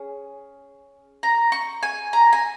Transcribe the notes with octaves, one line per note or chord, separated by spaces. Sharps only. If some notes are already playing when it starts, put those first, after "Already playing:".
Already playing: C#4 G#4
A#5
C#6
G#5
A#5
G#5